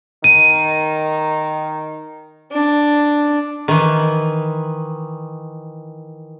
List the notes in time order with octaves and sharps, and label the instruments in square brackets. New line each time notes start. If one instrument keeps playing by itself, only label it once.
[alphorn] D#3 [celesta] D#7
[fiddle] D4
[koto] D#3 E3